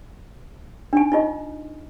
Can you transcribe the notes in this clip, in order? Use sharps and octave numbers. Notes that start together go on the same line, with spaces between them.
D4 D#4 G#5
D#4 F4 D#5